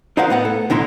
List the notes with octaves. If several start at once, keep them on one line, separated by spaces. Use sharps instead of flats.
D#4 A#4 C5 F5 F#5
A2 B3 F#5
A4
B1 A2 D3 D#4 E4 C6